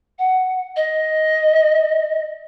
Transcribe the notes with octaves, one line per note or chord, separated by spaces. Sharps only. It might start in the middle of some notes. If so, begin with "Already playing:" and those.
F#5
D#5